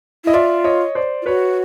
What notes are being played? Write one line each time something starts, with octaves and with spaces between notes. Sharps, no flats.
E4 D#5
F4 D5 E5
C#5 D#5
C5 D5
F4
F#4 B4 C#5